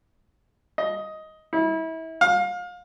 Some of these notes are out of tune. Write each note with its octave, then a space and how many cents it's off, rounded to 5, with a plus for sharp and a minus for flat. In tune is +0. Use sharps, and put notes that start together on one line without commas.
D#5 +10
E4 -30
F5 +30